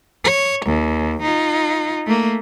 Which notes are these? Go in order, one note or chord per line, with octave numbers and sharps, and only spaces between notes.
C#5
D#2
D#4 F4
A3 A#3